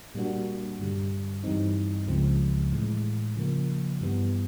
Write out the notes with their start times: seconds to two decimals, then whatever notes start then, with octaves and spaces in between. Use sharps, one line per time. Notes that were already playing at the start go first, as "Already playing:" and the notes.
0.15 A#2 G3 A#3 D4 F#4
0.79 G2 D3 G3
1.43 G2 E3 G3 C4 D#4
2.07 C#2 C#3 F3 G#3 C4
2.72 A2 E3 G#3
3.36 C#3 F3 A#3
4.01 G2 E3 G3 B3